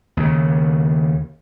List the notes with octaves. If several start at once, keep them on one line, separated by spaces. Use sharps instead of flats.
D#2 C#3